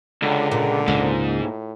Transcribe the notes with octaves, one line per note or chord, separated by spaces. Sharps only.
C#2 D3
A#2 D3
C#2 G#2
A2